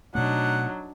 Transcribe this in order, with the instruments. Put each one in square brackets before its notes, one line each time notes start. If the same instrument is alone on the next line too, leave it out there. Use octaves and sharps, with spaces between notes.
[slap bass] B2 A3 [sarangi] F#3 [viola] D4 D#4 [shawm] F#5